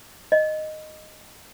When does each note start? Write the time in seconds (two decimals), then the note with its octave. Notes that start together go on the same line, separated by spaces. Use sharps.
0.32 D#5